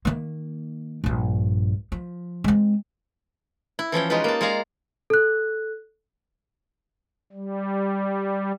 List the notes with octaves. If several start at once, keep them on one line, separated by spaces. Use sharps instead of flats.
D#3 A#3
A#1 G2
F3
G#3 C4
E4
E3 F3 C#4 G5
G#3 D#4 F4 G4 B4
A#3 A5
G#3 D5 F5 G#5 A#5
A4 F#6
G3